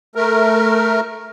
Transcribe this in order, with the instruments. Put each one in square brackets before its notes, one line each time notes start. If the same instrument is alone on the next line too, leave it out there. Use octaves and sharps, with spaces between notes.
[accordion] A3 A#4